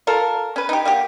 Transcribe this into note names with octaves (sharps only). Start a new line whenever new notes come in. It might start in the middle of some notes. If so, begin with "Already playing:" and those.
F4 A4 A#4
C#4 B4
D#4 G4
A#3 F#4 G4